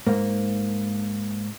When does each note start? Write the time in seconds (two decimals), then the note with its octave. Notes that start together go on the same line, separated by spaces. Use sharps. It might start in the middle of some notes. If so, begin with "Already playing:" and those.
0.07 G#2 A#3